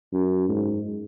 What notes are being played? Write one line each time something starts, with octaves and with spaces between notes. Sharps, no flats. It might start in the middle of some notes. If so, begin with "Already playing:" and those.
F#2
G#2